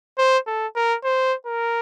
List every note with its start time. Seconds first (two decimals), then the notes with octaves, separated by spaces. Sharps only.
0.18 C5
0.47 A4
0.76 A#4
1.04 C5
1.47 A#4